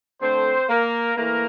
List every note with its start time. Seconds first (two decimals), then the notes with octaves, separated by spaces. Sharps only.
0.21 D3 A3 C4 C5
0.69 A#3 A#4
1.17 E3 A3 A#3 A#4